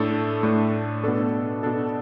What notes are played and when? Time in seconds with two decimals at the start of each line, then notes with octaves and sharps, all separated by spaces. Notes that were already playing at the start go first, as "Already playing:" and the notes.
Already playing: A2 A3 D4 A4
0.43 A2 A3 D4 A4
1.04 B2 B3 D4 A4
1.63 B2 B3 D4 A4